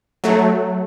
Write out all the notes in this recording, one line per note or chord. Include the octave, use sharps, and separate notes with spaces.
F#3 A3